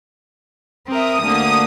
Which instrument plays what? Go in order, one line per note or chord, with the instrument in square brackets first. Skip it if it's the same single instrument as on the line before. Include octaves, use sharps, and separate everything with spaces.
[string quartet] C4 A#4 E5 [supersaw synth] D#6
[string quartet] D2 D3 A#3